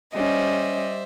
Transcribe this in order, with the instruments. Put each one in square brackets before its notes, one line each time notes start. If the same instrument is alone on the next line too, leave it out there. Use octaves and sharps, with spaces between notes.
[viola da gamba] G3 [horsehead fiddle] C#4 [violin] C5 E5 [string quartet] D#5